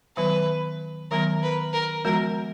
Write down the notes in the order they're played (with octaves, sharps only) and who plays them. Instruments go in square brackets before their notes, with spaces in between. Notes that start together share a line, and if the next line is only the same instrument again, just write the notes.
[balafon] D#3 F#3 B3 [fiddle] B4
[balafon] D#3 F#3 B3 [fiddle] A#4
[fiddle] B4
A#4
[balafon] F3 G#3 B3 F#4 [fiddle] A#4